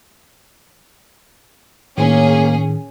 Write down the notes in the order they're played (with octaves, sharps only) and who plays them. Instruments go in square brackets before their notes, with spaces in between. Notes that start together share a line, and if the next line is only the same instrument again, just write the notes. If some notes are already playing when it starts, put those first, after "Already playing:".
[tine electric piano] A2 D#3 [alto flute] A#3 [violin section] C#4 G#4